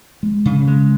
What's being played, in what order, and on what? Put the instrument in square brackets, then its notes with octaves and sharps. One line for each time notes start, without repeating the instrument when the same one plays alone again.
[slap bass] G#3
C#3
G#3